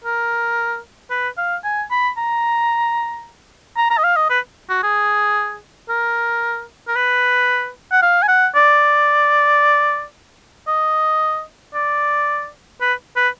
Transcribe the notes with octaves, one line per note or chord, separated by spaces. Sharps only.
A#4
B4
F5
G#5
B5
A#5
A#5
A#5
D#5
F5
D#5
B4
F#4
G#4
A#4
A#4
B4
F#5
F5
G#5
F#5
D5
D#5
D5
B4
B4